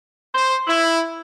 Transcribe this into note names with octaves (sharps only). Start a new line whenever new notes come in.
C5
E4